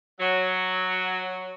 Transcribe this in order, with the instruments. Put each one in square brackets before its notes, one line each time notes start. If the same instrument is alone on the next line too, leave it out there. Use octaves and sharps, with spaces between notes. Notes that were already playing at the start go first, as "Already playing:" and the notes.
[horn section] F#3